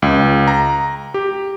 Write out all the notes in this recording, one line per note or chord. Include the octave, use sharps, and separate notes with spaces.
C#2
A#5
G4